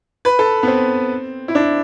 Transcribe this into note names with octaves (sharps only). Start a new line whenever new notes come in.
B4
A4
B3
C4
E4
D4